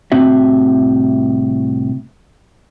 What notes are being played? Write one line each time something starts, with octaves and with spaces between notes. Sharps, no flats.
C2 A2 C4 F#4 E5